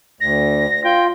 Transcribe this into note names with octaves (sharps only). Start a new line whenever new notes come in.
D2 A#6
F4 G5